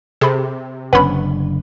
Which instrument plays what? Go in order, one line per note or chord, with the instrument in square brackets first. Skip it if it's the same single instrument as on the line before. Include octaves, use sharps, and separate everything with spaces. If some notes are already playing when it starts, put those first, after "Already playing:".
[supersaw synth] C3 [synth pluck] G#4 B5 [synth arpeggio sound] A4
[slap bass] F#1 D3 D4 [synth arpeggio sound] B3 C#4 B4 [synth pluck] F#5 B5